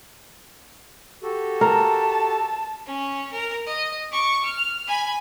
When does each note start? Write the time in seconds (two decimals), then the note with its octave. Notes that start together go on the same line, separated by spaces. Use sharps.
1.23 F#4 G4 A4
1.61 A#4 A5
2.86 C#4
3.32 A#4
3.66 D#5
4.12 C#6 D6
4.43 F6
4.88 G#5 B5